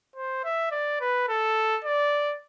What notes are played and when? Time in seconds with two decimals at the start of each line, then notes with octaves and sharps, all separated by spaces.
0.16 C5
0.44 E5
0.72 D5
1.01 B4
1.29 A4
1.84 D5